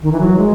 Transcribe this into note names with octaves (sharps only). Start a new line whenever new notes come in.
D#3
E3
F#3
G#3